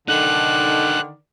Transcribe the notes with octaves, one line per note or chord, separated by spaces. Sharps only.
D3 D#3 D#4 A4 D5 F#6